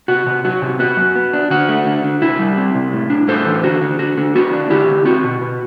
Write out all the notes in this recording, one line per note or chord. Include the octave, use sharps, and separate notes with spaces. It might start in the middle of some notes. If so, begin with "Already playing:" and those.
C3 F#4
C3
F#3 F#4
C3
B3 F#4
F#2
B3
D4
D3 F#4
A3
D3
D3
C3 E4
G3
C4
C3
A2
D4
A2 A4 C5
E3
D3 F#4
D3
D3 F#4
D3
B3 F#4
D4
D3 E4 G4
D3
C4 F#4
B2
B2